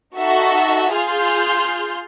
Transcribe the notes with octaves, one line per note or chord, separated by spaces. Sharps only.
D#4 F#4 A4 E5
F4 G#4 C6 F6 G6